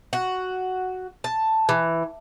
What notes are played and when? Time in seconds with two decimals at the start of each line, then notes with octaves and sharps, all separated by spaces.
0.13 F#4
1.24 A5
1.69 E3